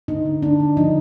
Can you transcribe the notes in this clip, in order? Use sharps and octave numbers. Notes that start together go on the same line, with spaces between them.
D3 D#4
D3
D4
D3
F3 D#4